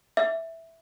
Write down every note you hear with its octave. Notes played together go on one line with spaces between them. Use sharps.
E5